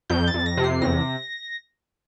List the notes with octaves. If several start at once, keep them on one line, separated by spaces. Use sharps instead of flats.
F2 G6
A6
F2
A#6
C3
C7
E2 A#6